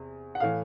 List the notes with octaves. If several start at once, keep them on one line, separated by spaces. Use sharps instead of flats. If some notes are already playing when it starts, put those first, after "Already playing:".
Already playing: E2 C3
F#5
A2 E3 F5